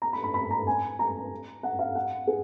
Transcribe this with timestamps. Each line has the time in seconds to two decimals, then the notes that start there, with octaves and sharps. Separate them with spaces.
0.02 A#5
0.13 B5
0.24 B5
0.34 B5
0.51 A#5
0.67 G#5
0.99 A#5
1.63 F#5
1.79 F5
1.95 F#5
2.27 G#4